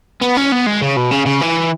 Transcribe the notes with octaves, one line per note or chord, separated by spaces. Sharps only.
B3
C#4
B3
G#3
C#3
B2
C#3
C#3
E3